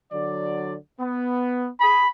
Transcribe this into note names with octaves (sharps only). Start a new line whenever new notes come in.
D3 F#3 D5
B3
G#4 B5